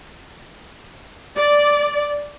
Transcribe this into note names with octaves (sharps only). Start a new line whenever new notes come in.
D5